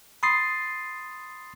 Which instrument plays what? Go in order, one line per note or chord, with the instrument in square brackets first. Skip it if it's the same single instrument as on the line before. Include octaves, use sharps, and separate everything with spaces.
[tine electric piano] B5 C6 D#6 A6 C7